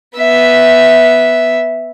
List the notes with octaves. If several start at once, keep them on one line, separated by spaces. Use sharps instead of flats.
B3 E5